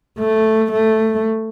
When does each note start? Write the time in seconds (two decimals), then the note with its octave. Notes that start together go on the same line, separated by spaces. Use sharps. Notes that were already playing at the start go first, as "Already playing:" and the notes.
0.19 A3
0.72 A3